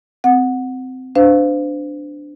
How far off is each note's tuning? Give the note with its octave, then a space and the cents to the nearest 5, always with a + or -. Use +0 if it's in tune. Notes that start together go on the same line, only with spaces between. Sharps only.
C4 -20 F#5 -10
D4 +0 C5 -35 F5 +0